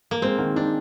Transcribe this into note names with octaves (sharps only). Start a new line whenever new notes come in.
A#3
G#3 C4
D#3
D4 D#4